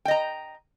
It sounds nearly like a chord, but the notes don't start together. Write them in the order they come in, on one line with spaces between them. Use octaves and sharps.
G5 D#5 A#5